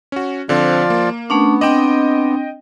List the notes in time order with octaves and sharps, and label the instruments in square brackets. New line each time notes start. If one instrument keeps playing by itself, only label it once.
[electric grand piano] C#4 F#4
[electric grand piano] D3 C4 [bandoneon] F3 F4 D5
[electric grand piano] A#3
[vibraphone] A3 C#4 D4 [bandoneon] B3
[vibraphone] C4 D4 [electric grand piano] D#5 G5